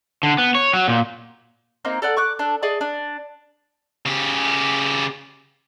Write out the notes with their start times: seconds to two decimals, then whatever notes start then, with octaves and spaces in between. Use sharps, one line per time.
0.23 D3
0.38 B3
0.55 C#5
0.73 F#3
0.88 A#2
1.85 A#3 C4 D#4
2.02 A4 D5 F#5 F6
2.17 C#6 D6 F#6
2.39 D4 A4
2.62 G#4 D5 D#5 A5
2.81 D4
4.06 C#3 G4